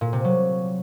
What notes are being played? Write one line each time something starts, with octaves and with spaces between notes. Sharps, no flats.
A#2
C3
F#3